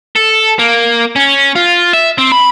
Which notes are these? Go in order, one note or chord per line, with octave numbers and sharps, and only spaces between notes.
A4
A#3
C#4
F4
E5
C4
B5